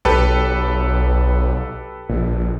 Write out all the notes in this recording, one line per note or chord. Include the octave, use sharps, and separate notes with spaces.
B1 G4 A4 B4
A#1